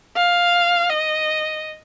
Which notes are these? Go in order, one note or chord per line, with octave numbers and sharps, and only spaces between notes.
F5
D#5